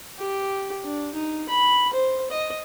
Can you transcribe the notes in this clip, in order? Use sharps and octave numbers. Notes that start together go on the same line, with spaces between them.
G4
D4
D#4
B5
C5
D#5